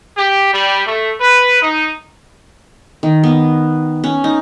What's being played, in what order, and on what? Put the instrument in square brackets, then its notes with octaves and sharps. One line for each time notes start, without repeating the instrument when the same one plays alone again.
[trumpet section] G4
G3
A3
B4
D#4
[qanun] D#3
B3
C#4
D#4